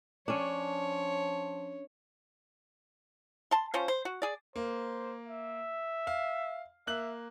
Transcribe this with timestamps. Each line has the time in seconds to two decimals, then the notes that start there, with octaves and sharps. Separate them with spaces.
0.28 F3 C#4 D4 C#5
3.51 A5 C6
3.74 F3 C#4 C5
3.88 C5
4.05 F#4
4.22 G#4 D5
4.56 A#3 C5
5.28 E5
6.07 F5
6.87 A#3 E5 F#6 F#7